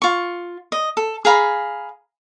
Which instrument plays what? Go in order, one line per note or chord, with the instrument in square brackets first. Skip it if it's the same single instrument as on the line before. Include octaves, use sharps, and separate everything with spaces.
[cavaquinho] F4 C#6
D#5
A4
G#4 F5 A#5 B5